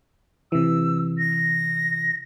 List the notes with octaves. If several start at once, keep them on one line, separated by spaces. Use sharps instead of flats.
C3 E3 E6
A#6